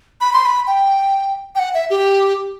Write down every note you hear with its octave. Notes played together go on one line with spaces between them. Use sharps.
B5
C6
B5
G5
G5
F#5
E5
G4